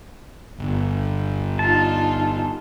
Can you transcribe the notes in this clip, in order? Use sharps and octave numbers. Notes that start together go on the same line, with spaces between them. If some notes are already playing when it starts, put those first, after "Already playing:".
G1
D#4 F4 A5